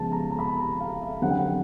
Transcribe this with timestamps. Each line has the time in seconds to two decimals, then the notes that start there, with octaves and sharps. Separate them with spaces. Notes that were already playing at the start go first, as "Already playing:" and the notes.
Already playing: C#3 F3 G#3 B3 A5
0.12 A#5
0.30 A#5
0.39 B5
0.59 A#5
0.80 F5
1.01 E5
1.22 F#2 D3 G3 C4 F#5
1.30 G5
1.37 F#5